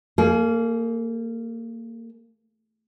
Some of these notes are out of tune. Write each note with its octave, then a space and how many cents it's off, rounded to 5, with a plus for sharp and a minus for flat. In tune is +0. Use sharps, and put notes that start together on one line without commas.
A#3 -25 G#4 +35